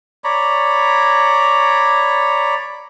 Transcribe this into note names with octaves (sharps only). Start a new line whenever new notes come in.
C#5 D5 A#5 B5